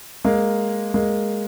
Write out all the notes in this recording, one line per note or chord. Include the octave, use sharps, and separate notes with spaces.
G#3 A#3
G#3 A#3